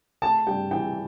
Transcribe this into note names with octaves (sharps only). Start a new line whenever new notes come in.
A3 A5
G2 G5
E3 G5